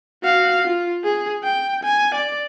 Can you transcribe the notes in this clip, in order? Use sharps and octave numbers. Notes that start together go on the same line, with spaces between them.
F#4 F5
F4
G#4
G5
G#5
D5